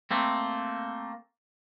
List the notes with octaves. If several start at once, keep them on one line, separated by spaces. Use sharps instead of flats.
A3 A#3 C4